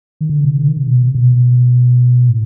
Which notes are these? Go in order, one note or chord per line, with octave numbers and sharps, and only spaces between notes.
D#3
D3
C3
D3
D#3
C3
B2
C3
B2
A2